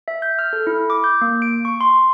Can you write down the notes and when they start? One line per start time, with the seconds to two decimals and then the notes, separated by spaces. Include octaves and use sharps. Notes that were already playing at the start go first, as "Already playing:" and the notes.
0.08 E5
0.22 G6
0.39 F6
0.53 A4
0.67 E4
0.90 D6
1.04 G6
1.21 A#3
1.42 D7
1.65 C#6
1.81 C6